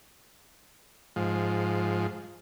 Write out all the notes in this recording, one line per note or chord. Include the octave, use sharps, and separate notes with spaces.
G#2 F3